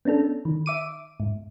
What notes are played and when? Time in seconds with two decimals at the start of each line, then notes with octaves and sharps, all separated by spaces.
0.05 B3 C#4 D4 A4
0.45 D#3
0.66 E5 D6 D#7
1.20 G#2